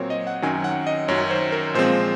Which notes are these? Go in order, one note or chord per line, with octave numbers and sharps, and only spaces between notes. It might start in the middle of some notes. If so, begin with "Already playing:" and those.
Already playing: A#2 F#3 C4 A#4 C#5
D#5
F#5
F#2 D#3 F#3 C#4 G#5
F#5
D#5
F#2 D#3 F#3 C#4 C#5
C5
A#4
A#2 F3 G#3 C4 C5